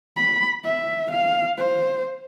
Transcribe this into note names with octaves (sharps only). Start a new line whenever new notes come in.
B5
E5
F5
C5